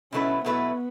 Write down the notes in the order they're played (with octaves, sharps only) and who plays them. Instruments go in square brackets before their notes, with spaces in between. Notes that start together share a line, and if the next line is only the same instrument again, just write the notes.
[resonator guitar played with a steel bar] B2 F#3 A3 E4 B4 [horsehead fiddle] C#4
[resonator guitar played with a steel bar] B2 F#3 A3 E4 B4 [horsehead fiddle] B3